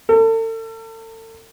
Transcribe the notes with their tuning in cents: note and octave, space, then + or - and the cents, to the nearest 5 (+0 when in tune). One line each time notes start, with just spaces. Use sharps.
A4 +40